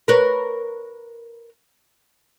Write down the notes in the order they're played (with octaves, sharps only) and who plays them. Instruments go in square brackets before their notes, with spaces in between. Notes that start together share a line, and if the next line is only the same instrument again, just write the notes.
[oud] A#4 B4 C#5